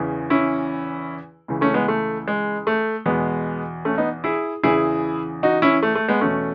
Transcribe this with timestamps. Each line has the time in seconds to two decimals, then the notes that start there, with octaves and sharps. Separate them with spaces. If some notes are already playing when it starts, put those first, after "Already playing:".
Already playing: E2 C#3 E3
0.30 C#4 E4
1.48 C#2 C#3 E3
1.61 A3 C#4
1.74 G#3 B3
1.88 A3
2.28 G#3
2.67 A3
3.06 E2 B2 G#3 B3
3.85 A3 C#4
3.98 B3 D#4
4.24 E4 G#4
4.63 E2 C#3 E3 E4 G#4
5.43 D#4 F#4
5.62 C#4 E4
5.83 A3
5.95 A3
6.09 G#3 B3
6.21 E2 B2 A3 C#4